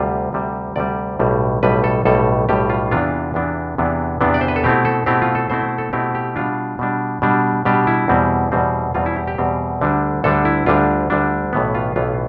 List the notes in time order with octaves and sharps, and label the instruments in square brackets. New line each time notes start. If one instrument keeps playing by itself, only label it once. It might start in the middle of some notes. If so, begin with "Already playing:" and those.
Already playing: [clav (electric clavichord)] D2 C3 G3 F4
D2 C3 G3
D2 C3 G3 D5
B1 A2 G3
B1 A2 G3 B4
A4
B1 A2 G3 A4
B1 A2 G3 G4
F4
E2 C3 E3 B3 D4 F4
E2 C3 E3 B3 D4
E2 C3 E3 B3 D4
E2 C3 E3 B3 D4
D5
C5
B4
A4
B2 A3 C4 E4 G4
A4
B2 A3 C4 E4 G4
F4
A4
B2 A3 C4 E4 C5
A4
B2 A3 C4 E4 G4
G4
B2 G3 D4 F4
B2 G3 D4
B2 G3 D4
B2 G3 D4 G4
E4
E2 B2 G3 C4
E2 B2 G3 C4
E2 B2 G3 C4 F4
E4
G4
G4
E2 B2 G3 C4
D2 D3 G3 D4
D2 D3 G3 D4 A4
E4
D2 D3 G3 D4 F4
D2 D3 G3 D4
B1 A2 E3 B3
F4
B1 A2 E3 B3 F4